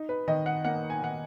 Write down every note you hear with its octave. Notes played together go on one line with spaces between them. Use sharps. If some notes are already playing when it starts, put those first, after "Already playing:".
Already playing: D#4
B4
D#3 D#5
F#5
A#3 F#5
G#5
D#3 F#5